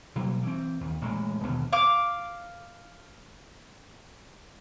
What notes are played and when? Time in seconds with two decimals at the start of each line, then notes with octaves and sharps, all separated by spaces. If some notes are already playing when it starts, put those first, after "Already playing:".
0.16 B2 F#3 G3 A#3
0.43 E3 C4
0.81 D#2
1.02 A1 A#2 G#3
1.43 D#2 B2 D3
1.73 F5 D6